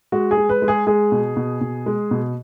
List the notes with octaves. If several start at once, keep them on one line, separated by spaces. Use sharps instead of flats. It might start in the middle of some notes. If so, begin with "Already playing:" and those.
G#3 F#4
G#4
G#3
B4
G#3
G#4
G#3 G#4
B2
B2
B2
G#3
B2